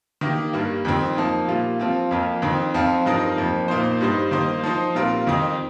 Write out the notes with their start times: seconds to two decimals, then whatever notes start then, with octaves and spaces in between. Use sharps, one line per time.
0.21 D#3 A#3 G4
0.53 G2 G3 A#3
0.85 F2 D#3 C4
1.17 F3 A#3 D#4
1.48 A#2 G3 A#3 F4
1.79 F3 C4 F4
2.11 F2 F3 A#3 F4
2.42 F2 D#3 C4
2.74 F2 F3 C4 F4
3.05 G2 F3 D#4 A#4
3.37 F2 F3 A#3
3.68 A#2 A#3 D#4 C5
4.01 G2 G3 D#4 C5
4.31 D#3 A#3 D#4 C5
4.64 F3 D#4 C5
4.95 A#2 G3 C4 F4 A#4
5.27 F2 D#3 C4 D#4